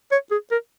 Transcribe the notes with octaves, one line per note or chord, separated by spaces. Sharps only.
C#5
G#4
A#4